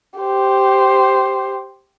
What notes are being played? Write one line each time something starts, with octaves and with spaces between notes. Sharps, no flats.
G4 C5